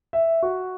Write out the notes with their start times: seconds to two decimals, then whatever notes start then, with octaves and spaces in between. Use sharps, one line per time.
0.13 E5
0.42 F#4